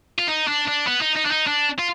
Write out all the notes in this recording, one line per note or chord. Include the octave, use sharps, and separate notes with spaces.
F4
D#4
D4
D4
B3
D#4
D#4
D4
D#4
D4
F4